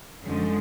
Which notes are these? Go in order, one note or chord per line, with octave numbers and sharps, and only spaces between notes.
F#2 D3 F3 G#3